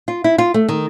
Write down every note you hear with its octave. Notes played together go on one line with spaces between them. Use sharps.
F4
E4
F4
A3
D#3